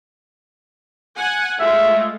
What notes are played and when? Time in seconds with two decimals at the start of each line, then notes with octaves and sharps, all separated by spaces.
1.17 F#5 G#5
1.61 G#3 A3 F4 E5